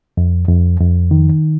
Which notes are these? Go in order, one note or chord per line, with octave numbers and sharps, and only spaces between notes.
F2
F2
F2
D#3